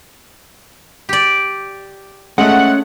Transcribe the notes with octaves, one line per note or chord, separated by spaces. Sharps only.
G4 D5
G#3 A3 C#4 F#5